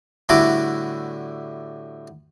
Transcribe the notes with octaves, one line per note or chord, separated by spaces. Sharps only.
A2 D3 G3 E4 F#4 D6